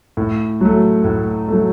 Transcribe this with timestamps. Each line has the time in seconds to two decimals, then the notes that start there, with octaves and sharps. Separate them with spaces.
0.17 A2
0.61 F#3 A3
1.04 A2
1.48 F#3 A3